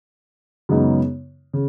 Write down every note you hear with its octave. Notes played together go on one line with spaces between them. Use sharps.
F#2 C#3 G#3 B3 D#4
C#3